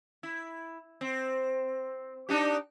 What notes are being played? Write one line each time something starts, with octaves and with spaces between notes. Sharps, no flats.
E4
C4
D4 D#4 G4